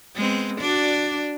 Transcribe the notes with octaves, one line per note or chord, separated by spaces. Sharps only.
G#3 B3 C4
D4 F#4 D5